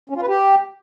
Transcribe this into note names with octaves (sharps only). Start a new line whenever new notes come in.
C#4
F4
B4
G4